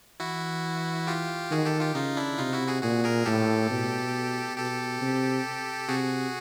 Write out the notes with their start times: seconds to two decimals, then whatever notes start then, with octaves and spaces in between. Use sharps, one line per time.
0.20 E3 E4 F#4
1.07 F4 G4
1.51 D#3 F#4 G#4
1.65 G4 A4
1.80 F4 G4
1.95 C#3 D#4 F4
2.17 D4 E4
2.38 C3 D#4 F4
2.53 E4 F#4
2.67 F#4 G#4
2.82 A#2 F#4 G#4
3.05 G#4 A#4
3.26 A2 G4 A4
3.70 B2
4.57 B2 G4 A4
5.01 C3
5.88 C3 F#4 G#4